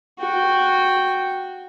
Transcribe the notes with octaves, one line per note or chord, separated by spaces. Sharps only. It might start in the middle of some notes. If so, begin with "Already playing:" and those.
F#4 G5